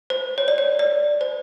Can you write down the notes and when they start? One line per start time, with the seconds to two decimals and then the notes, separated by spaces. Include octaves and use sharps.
0.10 C5
0.38 C#5
0.48 D5
0.58 C#5
0.79 D5
1.21 C5